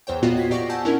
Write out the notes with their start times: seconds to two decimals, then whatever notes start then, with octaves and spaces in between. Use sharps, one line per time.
0.07 E2 C5 C#5 G5
0.22 A#2 B3 F4 F#4 D#5 F#5
0.37 G#6 B6 C7
0.50 A#2 G4 D5 C#6 A#6 D7
0.69 F#5 G#5 A5 E6 G6
0.85 C#4 D4 E4 A#4